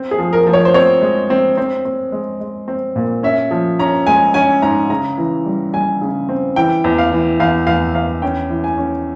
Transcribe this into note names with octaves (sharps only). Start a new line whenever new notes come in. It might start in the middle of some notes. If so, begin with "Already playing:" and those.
Already playing: C4
G#4
F3
A#4
F3
C#5
C5
C4 C#5
G#3
C4
C4
C4
G#3
G#3
C4
A#2
C#4 E5
F3
C#4 A#5
G#3 G#5
C#4 G#5
G#2 A#5
C#3 A#5
E3
G3
G3 G#5
C#3
C4
E3 G5
E2
F5
E3
E2 F5
E2 F5
E2 F5
C#4 G5
E3
G#5
C#4